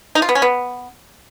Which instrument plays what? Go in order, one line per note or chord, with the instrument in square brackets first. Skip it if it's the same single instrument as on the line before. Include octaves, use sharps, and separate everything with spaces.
[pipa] D#4
F4
B3
C#4
B3